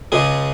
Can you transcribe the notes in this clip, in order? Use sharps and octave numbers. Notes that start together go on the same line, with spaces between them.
C#2 C#3 G#3 G#4